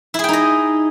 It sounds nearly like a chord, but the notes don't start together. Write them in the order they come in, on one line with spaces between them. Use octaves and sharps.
E4 G#4 G5 D#4 D#5